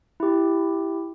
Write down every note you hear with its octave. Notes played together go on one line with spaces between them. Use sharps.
E4 G4